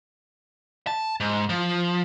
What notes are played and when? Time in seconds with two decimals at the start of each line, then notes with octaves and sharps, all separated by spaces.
0.87 A5
1.20 G#2
1.50 F3